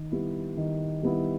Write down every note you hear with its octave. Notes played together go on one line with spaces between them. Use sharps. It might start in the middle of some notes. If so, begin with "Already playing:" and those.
Already playing: D#3
G3 B3 E4
D#3
G3 B3 E4